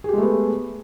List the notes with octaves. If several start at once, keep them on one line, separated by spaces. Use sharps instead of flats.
G#3 A3 B3 G4 G#4